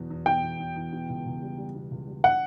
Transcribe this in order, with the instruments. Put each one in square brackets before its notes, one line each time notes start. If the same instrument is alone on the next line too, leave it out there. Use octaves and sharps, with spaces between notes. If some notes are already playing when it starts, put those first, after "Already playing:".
Already playing: [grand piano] E2 B2 F#3
E2
[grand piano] B2 [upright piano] G5
[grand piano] E2
E2
E2
B2
C#2
C#2
G3
G3
B2
C#2
G3
[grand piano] D4 [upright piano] F#5